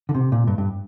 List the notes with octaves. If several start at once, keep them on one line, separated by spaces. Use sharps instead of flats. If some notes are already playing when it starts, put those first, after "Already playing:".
D3
C3
A#2
G2
G2